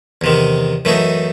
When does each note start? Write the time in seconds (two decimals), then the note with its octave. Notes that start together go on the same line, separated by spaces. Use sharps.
0.21 E2 C3 D#3
0.85 F#2 E3 A3 D#4